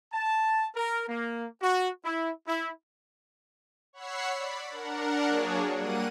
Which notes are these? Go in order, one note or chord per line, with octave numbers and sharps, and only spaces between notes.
A5
A#4
A#3
F#4
E4
E4
C#5 F#5 B5 C#6 E6 C7
D5 B5
D4 A#4 F#5
F#3 A#3 D4 G#4 C#5
G3 A#3 F#5 D#7